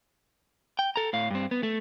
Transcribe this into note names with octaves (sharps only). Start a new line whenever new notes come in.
G5
A4 A#5
A2 F5
G2 C4
B3
A3